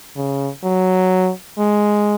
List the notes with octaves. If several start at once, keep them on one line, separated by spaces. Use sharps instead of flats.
C#3
F#3
G#3